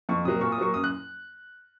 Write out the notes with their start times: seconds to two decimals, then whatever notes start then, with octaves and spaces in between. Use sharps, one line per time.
0.09 F2 C#6
0.25 C3 F#3 A#3 D#6
0.41 A#2 C#6
0.52 D#6
0.58 F#3 A#3 C#6
0.74 F#2 D#6
0.84 F#6